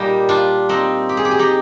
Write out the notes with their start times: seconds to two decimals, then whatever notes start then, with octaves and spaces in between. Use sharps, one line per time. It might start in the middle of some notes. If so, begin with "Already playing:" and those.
Already playing: A#2 G3 D#4 G4
0.29 D4 F4
0.69 C4 D#4
1.09 G4
1.17 G#4
1.25 G4
1.31 G#4
1.39 D#4 G4